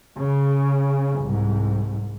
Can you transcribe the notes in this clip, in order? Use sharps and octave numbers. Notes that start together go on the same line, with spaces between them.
C#3
C2 G#2